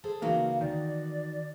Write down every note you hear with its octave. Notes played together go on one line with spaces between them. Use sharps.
G#4 A4 C5
C#2 E3 A#3 D#4 F#4 F5
D#3 D5